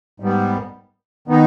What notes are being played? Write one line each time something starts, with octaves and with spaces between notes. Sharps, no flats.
G#2 G3 B3
D#3 B3 D#4